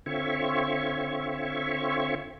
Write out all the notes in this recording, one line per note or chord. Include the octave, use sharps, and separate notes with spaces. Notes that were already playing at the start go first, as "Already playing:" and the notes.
D3 C4 F4 C#5 E5 C#6